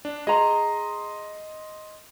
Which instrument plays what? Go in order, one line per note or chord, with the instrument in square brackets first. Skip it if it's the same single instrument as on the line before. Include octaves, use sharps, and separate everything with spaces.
[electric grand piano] D4
[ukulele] G#4 A#5 [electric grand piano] D#5 C6